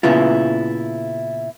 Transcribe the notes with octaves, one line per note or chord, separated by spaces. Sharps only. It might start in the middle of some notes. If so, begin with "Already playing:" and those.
A#2 C#3 B3 E4 F4